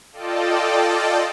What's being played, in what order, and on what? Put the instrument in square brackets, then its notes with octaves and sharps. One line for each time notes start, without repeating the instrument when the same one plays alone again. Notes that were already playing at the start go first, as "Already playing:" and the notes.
[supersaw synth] F4 A4 D5 D#5 G5 A5